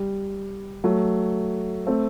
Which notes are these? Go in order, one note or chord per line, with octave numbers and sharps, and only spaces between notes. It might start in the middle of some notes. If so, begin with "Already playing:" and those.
Already playing: G3
F#3 A3
A3 C4